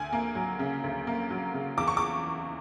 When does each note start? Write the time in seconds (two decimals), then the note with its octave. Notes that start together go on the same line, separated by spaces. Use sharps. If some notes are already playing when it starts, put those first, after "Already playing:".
Already playing: D2 G#5
0.13 A#3
0.35 F#3
0.59 C#3
0.84 D2
1.07 A#3
1.30 F#3
1.54 C#3
1.77 E2 D6
1.88 C#6
1.97 D6